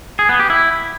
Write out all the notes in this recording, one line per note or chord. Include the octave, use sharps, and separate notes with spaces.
G#4
B3
G4
E4